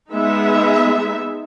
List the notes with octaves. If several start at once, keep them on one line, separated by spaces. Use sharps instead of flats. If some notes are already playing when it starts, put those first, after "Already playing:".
G#3 B3 D#4 E5